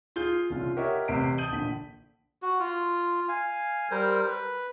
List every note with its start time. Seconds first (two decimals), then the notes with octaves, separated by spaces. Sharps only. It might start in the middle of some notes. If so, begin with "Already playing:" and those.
0.16 F4 G#4 G6 G7
0.50 C2 C#3 F4
0.77 G4 A#4 C#5 D#5 E5 F#5
1.08 A1 C3 C7 D7
1.38 A5 D#6 G6 D#7 F#7 G7
1.52 A#1 D3 B6
2.42 F#4
2.60 F4
3.29 F5 G#5
3.91 G3 A#4 C5
4.27 B4